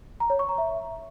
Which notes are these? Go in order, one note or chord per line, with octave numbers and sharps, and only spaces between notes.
A#5
C#5
C#6
A#5
E5